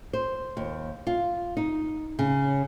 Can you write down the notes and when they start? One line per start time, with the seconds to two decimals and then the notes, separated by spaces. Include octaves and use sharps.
0.13 C5
0.57 D#2
1.07 F4
1.57 D#4
2.19 C#3